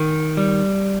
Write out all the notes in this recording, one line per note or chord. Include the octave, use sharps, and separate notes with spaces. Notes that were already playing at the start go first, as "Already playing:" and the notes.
Already playing: D#3
G3